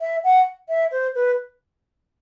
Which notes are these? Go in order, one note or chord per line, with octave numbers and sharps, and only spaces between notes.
E5
F#5
E5
C5
B4